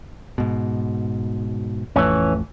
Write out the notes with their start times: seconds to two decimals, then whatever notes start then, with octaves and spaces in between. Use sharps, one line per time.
0.38 G#2 B2
1.96 A1 F2 E3 A3 C#4